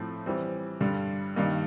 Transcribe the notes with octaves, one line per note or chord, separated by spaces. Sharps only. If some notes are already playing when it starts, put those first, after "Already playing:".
Already playing: A2 F3 A3 C4
E3 G3 C4
G2 D3 G3
G2 D#3 G3 A#3 D#4